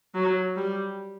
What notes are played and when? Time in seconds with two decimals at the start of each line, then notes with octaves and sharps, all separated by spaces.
0.14 F#3
0.56 G3